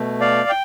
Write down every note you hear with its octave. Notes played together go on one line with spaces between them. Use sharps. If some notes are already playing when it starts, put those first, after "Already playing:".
Already playing: B2 A3
D5 F5
G5